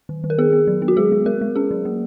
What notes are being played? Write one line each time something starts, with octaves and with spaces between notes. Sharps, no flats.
D#3
D#3
A#4
B3 G#4
B3
F#3
B3
F#4
G#3 G#4
G#3
G#3 A#4
G#3
C#4 G#4
F#3
A#3